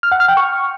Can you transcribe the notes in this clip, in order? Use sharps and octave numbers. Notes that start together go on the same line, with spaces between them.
F6
F#5
F6
G5
C#6